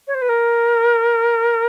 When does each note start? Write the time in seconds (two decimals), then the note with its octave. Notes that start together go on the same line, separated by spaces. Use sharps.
0.07 C#5
0.14 C5
0.21 B4
0.29 A#4